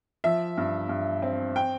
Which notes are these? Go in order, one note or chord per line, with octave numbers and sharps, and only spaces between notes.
F3 E5
G2
G2
C4
G5